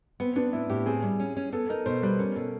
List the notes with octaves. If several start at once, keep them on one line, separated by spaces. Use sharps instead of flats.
B3 C4
B3 D4
A2 E4
A2 G4
C4 G#4
G3
C#4
C#4
B3 A4
D#4 A#4
B2 C5
G3 B4
C#4 A#4
B2 A4